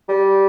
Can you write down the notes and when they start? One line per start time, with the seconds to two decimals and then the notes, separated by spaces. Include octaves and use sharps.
0.09 G3